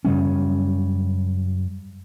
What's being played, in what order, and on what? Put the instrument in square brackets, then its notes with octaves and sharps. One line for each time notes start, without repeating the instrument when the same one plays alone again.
[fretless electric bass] F#2 C#3 G3 C#4